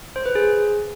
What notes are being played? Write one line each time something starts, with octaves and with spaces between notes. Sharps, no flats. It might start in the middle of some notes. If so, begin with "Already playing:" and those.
C5
B4
G#4